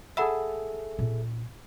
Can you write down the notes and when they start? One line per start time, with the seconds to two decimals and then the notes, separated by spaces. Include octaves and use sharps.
0.17 G#4 A4 E5 F#5 B5 E6
0.99 A#2 C#4